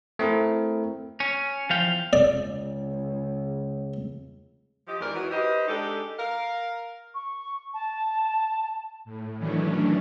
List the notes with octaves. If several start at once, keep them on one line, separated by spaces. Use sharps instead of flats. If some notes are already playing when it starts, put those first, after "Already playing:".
A3 C4 E4 A#4
C#4
E2 F3 F5 G5
C#2 D5
F3 G4 D#5
E2 D#3 G#3 A#4 C5 D5
E3 D#4 F#4
D#4 G4 B4 C5 D#5
G#3 D4 D#4 G4 A4
A#4 F5
C#6
A5
A2
D#3 E3 F#3 A3 C#4 D4